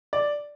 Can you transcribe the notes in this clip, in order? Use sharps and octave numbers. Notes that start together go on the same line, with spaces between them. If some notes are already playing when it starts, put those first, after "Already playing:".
D5